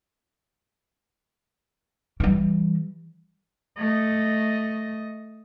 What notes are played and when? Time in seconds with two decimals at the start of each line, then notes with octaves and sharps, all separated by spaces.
2.20 E3 G3
3.78 A3 D#5